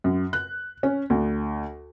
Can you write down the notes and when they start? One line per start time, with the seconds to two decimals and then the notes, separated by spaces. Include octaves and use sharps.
0.04 F#2
0.33 F#6
0.83 C#4
1.10 D2